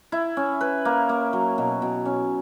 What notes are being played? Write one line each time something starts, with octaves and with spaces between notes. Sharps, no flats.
E4
C#4
B4
A#3
A#3
F#3
B2
B2
C#4